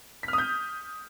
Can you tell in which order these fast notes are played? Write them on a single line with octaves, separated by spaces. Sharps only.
B6 F6 D#6 G6